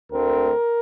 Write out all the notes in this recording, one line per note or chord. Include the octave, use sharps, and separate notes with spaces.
D2 D3 A3 C4 A#4